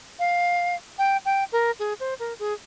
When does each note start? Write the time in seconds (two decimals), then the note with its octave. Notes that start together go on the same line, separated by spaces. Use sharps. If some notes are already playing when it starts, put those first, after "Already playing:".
0.19 F5
0.98 G5
1.25 G5
1.52 A#4
1.79 G#4
2.00 C5
2.19 A#4
2.39 G#4